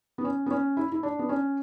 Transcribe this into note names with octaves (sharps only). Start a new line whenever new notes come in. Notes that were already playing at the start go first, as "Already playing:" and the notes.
B3
C#4
B3
C#4
E4
E4
D4
B3
C#4